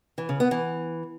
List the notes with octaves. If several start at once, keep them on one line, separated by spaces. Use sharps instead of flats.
E3
C#3
B3
E3